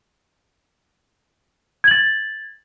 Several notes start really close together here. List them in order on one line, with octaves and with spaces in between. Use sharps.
G#6 F#7 A6